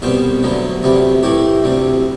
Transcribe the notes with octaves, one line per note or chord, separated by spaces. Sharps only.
C2 B2 G3 B3 C5
D2 D3 F#3 B3
D2 C3 G3 B3
A2 E3 A3 G4
D2 C3 G3